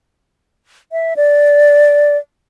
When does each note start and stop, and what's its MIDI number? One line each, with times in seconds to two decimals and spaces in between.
0.92 1.14 76
1.16 2.17 74